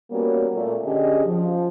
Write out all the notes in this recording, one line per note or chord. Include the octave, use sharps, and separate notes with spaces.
G3 A#3 B3 C#4 F#4 C#5
A#2 A3
D3 C#4 G4 G#4 D#5
F3